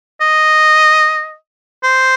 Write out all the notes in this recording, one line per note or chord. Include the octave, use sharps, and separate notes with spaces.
D#5
C5